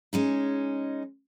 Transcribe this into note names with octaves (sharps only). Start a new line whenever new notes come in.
G#3 C#4 D#4